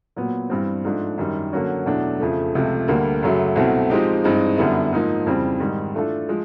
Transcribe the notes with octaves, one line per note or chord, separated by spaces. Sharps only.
A#2 F#3 B3
G2 E3 G3 C4
G#2 F3 A3 D4
F#2 D#3 G3
D3 F#3 A#3 C#4 F#4
E2 B2 F#3 A3 D4
F2 C#3 F3 A3
C#2 C3 F3 A3
D2 D3 G3 A#3
F#2 C#3 F#3 A3
C2 B2 F#3 A3 C4
F3 G#3 C4 D#4 G4
G2 E3 G#3 C4 D#4
F#2 D3 G3 B3 E4
G#2 F3 A#3 D#4
F2 C#3 E3 G3 C4
G#2 D#3 G3
E3 A3 D4 F4 A4
F3 G#3